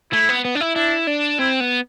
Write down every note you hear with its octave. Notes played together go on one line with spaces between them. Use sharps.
A3 E4
B3
B3
D4
E4
D4 E4
D4
C4 E4
B3